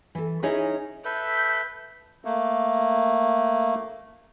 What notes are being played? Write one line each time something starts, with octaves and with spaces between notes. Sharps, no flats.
E3 A4
C#4 D#4 E4 G#4 C#5 D#5
A4 B4 E5 G6
A3 A#3